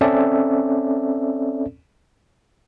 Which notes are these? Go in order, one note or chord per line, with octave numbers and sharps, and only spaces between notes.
C4 C#4 A4 D5 E5